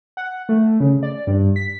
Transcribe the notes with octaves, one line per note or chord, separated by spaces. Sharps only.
F#5
A3
C#3
D5
G2
B6